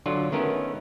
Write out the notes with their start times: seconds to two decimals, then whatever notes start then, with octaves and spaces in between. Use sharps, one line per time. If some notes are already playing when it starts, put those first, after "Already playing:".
0.06 D3 F#3 F4 D5
0.32 D#3 A3 B3 C#4 A#4